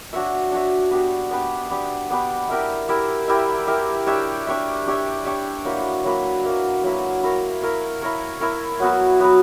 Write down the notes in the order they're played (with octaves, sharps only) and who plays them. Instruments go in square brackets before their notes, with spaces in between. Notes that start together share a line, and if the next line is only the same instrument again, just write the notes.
[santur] D4 F#4 C#5 E5
D4 F#4 C#5 E5
B3 D4 G4 B4
B3 D4 G4 B4
B3 D4 G4 B4
B3 D4 G4 B4
E4 G4 A#4 E5
E4 G4 A#4 E5
E4 G4 A#4 E5
E4 G4 A#4 E5
D4 G4 C#5 E5
D4 G4 C#5 E5
D4 G4 C#5 E5
D4 G4 C#5 E5
F#3 A#3 E4 B4
F#3 A#3 E4 B4
F#3 A#3 E4 B4
F#3 A#3 E4 B4
E4 A#4 C#5
E4 A#4 C#5
E4 A#4 C#5
E4 A#4 C#5
F#3 B3 F#4 B4
F#3 B3 F#4 B4